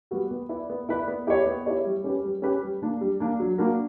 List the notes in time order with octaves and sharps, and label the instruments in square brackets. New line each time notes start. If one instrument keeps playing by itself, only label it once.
[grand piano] G3 B3 F#4
B3
E4 B4 D5
B3
E4 B4 D5
B3
E4 G4 C#5
B3
E4 G4 C#5
G3
C#4 G4 B4
G3
C#4 G4 B4
G3
A#3 D4
G3
A#3 D4
F#3
A#3 D4 F#4 A#4